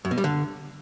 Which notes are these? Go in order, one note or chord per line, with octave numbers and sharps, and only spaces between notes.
F#2
B2
G3
D3